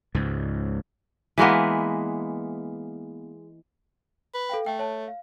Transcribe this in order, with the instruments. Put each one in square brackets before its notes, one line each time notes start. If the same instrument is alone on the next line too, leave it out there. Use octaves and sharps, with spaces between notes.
[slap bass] C#2 G#2
[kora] E3 G#3 A#3 B3
[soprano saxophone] B4
[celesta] A4 F5 G5
[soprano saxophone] A3 [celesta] G5
[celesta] C#5 A5
F5